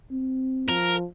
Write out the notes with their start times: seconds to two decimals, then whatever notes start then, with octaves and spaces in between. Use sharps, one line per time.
0.11 C4
0.69 F3 A#4